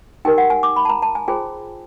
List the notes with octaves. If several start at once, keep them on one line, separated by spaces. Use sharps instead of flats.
D#4 G4 A#4 G5
F#5
G#5
D6
B5
A5
A#5
A5
G#5
F4 G#4 C5 G5